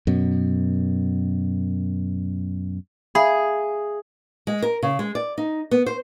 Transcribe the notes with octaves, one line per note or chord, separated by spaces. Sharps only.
F#2 B2
G#4 E5 F5 B5
G#3
A#4
C#3
G#3
D5
D#4
B3
C5